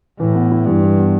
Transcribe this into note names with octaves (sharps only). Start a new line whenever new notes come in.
A2 E3
B3
E4
G2 E3
E3
B3